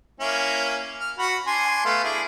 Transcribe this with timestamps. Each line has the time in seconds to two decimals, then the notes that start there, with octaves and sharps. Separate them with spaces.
0.20 A#3 C#4 E4
0.99 F6
1.19 F#4 F#5 B5
1.47 D4 G#5 C6
1.85 A3 B3 F5
2.04 D4 E4 G#4